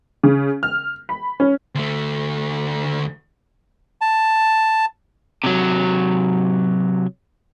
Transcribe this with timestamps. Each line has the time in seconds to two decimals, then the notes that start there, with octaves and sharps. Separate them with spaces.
0.23 C#3
0.63 F6
1.09 B5
1.40 C#4
1.75 D2 A3
4.01 A5
5.44 C3 F#3